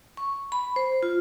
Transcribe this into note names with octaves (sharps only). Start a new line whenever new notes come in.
C#6
B5
C5
F4